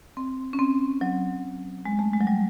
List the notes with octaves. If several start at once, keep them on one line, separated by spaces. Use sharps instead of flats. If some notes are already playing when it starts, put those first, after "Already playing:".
C4
C#4
C4
F#3
G#3
A3
G#3
F#3
G3